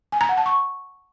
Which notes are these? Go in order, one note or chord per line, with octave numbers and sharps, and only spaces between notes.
G#5
A#5
F#5
A5
C#6